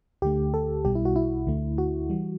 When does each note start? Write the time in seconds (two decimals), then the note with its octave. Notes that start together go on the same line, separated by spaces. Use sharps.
0.22 D2 D3 A3 G4
0.54 A4
0.85 B1 B2 G3 G4
0.95 E4
1.05 F#4
1.16 E4
1.47 D2 D3 A3
1.78 F#4
2.10 E3 G3